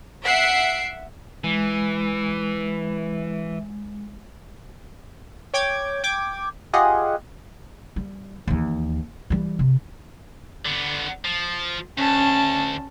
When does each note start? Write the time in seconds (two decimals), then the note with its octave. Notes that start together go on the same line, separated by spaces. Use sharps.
0.25 E5 F#5 C7 D7
1.44 E3 G#3
5.54 C#5 G5 D6 G#6
6.04 G5 D6 G#6
6.73 F4 G4 G#4 D#5 F#5
7.96 G3
8.47 D#2 E3
9.30 E3 G3
9.59 C3
10.65 D3 B3
11.25 F3
11.98 D2 C#4 A5